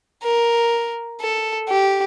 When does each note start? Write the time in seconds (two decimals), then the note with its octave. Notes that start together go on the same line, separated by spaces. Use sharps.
0.23 A#4
1.21 A4
1.69 G4